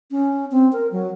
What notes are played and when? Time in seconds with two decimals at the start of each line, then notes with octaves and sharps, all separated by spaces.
0.11 C#4
0.51 C4
0.73 A#4
0.92 F#3